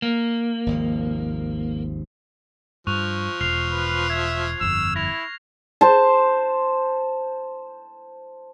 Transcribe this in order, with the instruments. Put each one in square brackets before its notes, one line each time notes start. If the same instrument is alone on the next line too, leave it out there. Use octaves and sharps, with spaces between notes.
[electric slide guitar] A#3
[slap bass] G#1 D#2 F3
[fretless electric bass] G2 [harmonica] F3 [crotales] C#6 F#6 F7
[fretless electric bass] E1 [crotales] F6 C7 F7
[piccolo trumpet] B4
[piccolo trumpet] E5 [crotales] G#6
[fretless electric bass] G1 F2 [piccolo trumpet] E6
[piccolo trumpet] E4 [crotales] A#6 F7
[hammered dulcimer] C5 A5